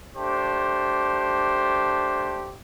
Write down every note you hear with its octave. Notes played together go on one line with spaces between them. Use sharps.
A3 D4 G4 C5